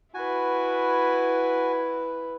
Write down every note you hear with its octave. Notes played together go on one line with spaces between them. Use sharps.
E4 F#4 B4 G#5